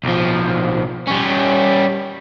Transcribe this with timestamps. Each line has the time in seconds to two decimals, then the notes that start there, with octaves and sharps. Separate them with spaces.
0.04 B1 F3
1.07 G3 C#4